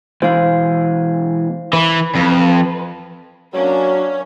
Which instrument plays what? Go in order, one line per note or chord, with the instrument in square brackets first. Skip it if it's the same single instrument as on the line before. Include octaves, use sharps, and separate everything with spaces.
[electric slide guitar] B2 E3 G#3 [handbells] C5 F5
[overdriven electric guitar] E3 [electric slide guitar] B4
[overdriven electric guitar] F2
[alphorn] F#3 [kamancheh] A#3 D4 [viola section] C#4 [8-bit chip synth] C#5